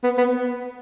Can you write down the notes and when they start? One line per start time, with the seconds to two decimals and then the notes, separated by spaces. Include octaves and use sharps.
0.04 B3
0.18 B3